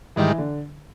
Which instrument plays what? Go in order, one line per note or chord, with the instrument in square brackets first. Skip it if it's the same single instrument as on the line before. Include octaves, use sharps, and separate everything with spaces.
[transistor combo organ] G#2 D#3 G3 [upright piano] E3
[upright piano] D3